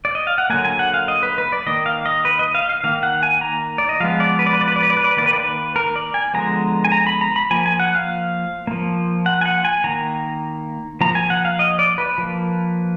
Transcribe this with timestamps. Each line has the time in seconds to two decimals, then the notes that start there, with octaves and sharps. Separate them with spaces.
0.05 D5
0.15 D#5
0.27 F5
0.38 F#5
0.50 D3 F#3 A#3 G#5
0.65 G#5
0.79 F#5
0.94 F5
1.08 D#5
1.23 B4
1.38 B4
1.52 D5
1.66 D#3 A#3 D#5
1.86 F5
2.06 D#5
2.25 B4
2.39 D#5
2.55 F5
2.69 F5
2.84 D#3 A#3 F5
3.03 F#5
3.23 G#5
3.41 A#5
3.78 D5
3.89 D#5
4.00 F3 G#3 B3 F5
4.20 D5
4.39 B4
4.46 D5
4.53 B4
4.61 D5
4.68 B4
4.76 D5
4.82 B4
4.90 D5
4.97 B4
5.04 D5
5.11 B4
5.17 D#3 A#3 D5
5.26 B4
5.33 D5
5.40 B4
5.76 A#4
5.96 D5
6.14 G#5
6.34 D3 F3 G#3 B3 A#5
6.85 G#5
6.92 A#5
7.07 B5
7.21 A#5
7.36 B5
7.51 F3 A#3 G#5
7.66 G#5
7.80 F#5
7.95 F5
8.67 F3 A#3
9.26 F#5
9.41 G#5
9.46 F#5
9.65 G#5
9.84 D#3 A#3 A#5
11.01 F3 A#3 A#5
11.15 G#5
11.30 F#5
11.45 F5
11.59 D#5
11.79 D5
11.98 B4
12.18 F3 A#3